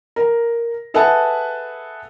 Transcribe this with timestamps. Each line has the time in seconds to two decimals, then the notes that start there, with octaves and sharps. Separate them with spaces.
0.16 A#4
0.94 G#4 A4 B4 E5 F#5 A5